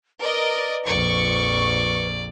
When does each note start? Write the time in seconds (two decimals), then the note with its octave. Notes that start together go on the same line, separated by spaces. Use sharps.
0.20 A#4 B4 D5 D#5
0.86 A#1 F2 D5 C#6